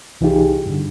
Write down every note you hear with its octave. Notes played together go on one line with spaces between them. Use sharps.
C2 E3 D#4 F4 G4 G#4
G2 D3